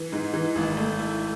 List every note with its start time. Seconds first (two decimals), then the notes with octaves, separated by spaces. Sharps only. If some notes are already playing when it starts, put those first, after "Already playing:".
Already playing: E3
0.12 G#2
0.34 E3
0.56 G#1
0.77 A3
0.99 E4